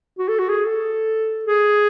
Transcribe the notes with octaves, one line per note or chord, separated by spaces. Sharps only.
F#4
A4
F#4
G#4
A4
G#4